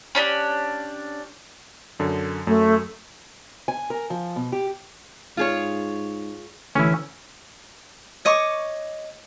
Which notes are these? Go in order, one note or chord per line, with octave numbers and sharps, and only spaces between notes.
C#4 D4 G4
F#2 D3
F#2 A3
G#5
A#4
F3
B2
G4
G#2 F4 G#4 C#5
A1 D3 E3 C#4 E4
C#5 D#5 C#6 D6